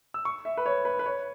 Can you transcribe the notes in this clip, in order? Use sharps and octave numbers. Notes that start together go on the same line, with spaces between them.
E6
C#6
E5
B4
C#5
B4
B4
C#5